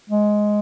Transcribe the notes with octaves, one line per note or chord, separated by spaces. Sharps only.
G#3